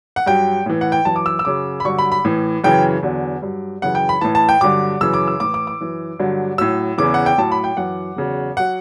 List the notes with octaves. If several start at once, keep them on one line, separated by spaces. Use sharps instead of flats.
F#5
G2 F#3 G5
A2 E3
F#5
G5
F#2 E3 A5
D6
E6
E6
F#2 C#3 F#3 D6
B5
G2 D3 F#3 C#6
B5
B5
A2 E3
F#2 C#3 E3 G5
E2 D3 F#3
G2 F#3
F#2 C#3 E3 F#5
G5
B5
A2 E3 A5
A5
G5
G2 D3 F#3 D6
F#2 C#3 E3 E6
D6
E6
A2 E3 D6
D6
D6
F#2 E3
G2 D3 F#3
A2 F#3 E6
E2 C#3 E3 D6
F#5
G5
A2 F#3 A5
B5
G5
F#2 E3 F#5
E2 C#3 F#3
F#3 F#5